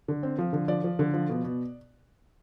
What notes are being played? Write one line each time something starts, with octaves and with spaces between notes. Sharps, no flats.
D3
C4
F3
D3
F3 D5
F3
D3
F3
B2
B2